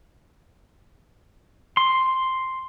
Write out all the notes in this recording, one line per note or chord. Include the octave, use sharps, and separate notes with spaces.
C6